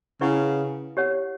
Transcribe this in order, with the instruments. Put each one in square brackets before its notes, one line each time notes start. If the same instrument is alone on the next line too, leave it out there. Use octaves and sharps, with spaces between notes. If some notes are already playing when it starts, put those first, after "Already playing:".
[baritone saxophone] C#3 [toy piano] E4 B4 F#5 C#6
[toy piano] G4 C#5 F#5